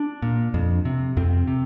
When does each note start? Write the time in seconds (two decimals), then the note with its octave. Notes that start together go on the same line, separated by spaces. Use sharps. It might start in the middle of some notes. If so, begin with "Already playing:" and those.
Already playing: D4
0.22 A#2
0.54 F2
0.85 C3
1.17 F2 C4
1.47 C3